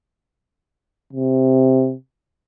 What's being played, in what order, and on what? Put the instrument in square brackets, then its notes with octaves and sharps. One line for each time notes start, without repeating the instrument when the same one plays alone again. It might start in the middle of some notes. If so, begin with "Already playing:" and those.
[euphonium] C3